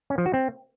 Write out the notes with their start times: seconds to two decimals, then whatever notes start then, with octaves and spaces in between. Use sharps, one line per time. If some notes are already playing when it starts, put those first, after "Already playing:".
0.10 C#4
0.18 F3
0.26 F#4
0.34 C4